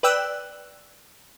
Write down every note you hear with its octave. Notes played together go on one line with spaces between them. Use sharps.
B4 D5 G5 E6 F#6